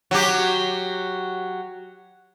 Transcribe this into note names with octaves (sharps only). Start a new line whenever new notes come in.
F#3 G4